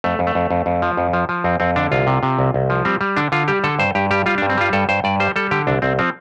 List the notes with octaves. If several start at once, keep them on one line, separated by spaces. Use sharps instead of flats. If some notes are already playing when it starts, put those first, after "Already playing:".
F2 A3
F2
A3
F2
F2
F2
F3
F2
F3
F3
F2 C4
F2 C4
D3 D4
C2 F4
C3
C3
C2
C2
F3
G3 C4
G3
D3 D4
D3 F4
G3 G4
D3 A4
G2 C5
G2 G4
G3 G4
G3 F4
D4
G2
C4
G3 F4
G2 A4
G2 C5
G2 D5
G3 C5
G3 A4
D3 G4
C2 D4
C2 C4
F3 C4